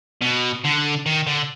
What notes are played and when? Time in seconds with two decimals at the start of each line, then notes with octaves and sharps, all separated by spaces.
0.21 B2
0.64 D3
1.06 D#3
1.27 D3